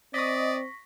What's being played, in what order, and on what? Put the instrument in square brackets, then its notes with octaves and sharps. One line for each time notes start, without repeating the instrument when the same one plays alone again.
[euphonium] C4 [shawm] D5 [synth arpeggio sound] D#5 D#6 [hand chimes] C#6 A#6 B6